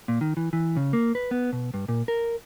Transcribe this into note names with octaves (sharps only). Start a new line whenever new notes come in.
A#2
D#3
E3
E3
C#3
A#3
B4
B3
B2
G2
A#2
A#4